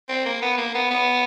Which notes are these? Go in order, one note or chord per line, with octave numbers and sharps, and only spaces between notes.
C4
A#3
B3
A#3
B3
B3